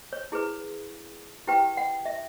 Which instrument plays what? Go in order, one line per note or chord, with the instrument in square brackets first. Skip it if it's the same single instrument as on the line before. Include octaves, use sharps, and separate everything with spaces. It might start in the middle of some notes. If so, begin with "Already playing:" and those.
[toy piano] C#5
E4 G#4 B4
E4 G4 B4 G5
F#5
E5